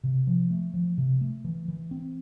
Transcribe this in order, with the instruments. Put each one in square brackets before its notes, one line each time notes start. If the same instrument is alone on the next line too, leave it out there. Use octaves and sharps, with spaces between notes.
[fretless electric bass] C3
F3
A3
F3
C3
A3
E3
E3
C4